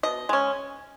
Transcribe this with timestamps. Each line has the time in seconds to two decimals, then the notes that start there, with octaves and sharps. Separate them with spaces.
0.03 B2 D#5
0.29 G#3 C#4